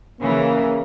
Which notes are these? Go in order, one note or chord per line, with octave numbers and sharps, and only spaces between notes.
C#3 E3 A#3